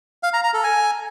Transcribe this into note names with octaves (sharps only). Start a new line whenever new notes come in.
F5
A#5
A#5
A4
G#5